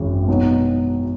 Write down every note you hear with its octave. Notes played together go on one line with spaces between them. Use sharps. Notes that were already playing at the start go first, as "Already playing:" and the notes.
Already playing: G#1 F#2 E3 G#3
B2 F#3 B3 D#4